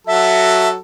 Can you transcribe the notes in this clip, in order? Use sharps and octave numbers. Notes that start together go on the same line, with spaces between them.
F#3 F#4 A4 E5